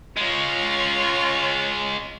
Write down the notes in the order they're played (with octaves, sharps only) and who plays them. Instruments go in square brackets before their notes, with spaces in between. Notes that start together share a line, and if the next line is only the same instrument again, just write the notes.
[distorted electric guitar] G#3 C#4 [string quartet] F4 C#5 A#5